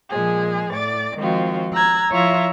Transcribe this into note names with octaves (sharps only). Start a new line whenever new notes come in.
A#2 F3 G#3 G#4
A2 D5 D6 A6
D#3 F3 G#3 C4 F4 F#4
A#5 E6 F#6 G#6
F3 E4 F4 C#5 E5 A#5